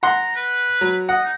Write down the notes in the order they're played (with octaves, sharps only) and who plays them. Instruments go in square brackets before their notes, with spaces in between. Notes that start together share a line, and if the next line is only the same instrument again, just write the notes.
[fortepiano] F#5 C6 [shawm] A#5
[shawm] B4
[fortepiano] F#3
[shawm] D#5 [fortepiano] F#5
[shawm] D#4